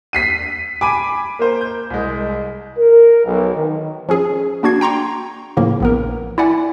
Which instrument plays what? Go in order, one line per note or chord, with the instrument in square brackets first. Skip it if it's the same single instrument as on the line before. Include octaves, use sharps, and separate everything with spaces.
[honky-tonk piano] B6 C7 D#7
[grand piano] G#5 B5 D#7 [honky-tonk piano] D6
[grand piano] A#3 A#4 C5
G6
C2 G#3
[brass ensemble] A#4
B1
D#3
[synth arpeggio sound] F3 C#4 G#4
A#3 D4 F#4 G#6 C7
G5 A#5 C6 C#6
A2 C#3 E3 F3 A#3
A#1 B3 A#4
E4 D5 F#5 G#5